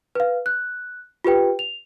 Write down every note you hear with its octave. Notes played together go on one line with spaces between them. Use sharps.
B4 F5
F#6
F4 G4 B4 G5
F7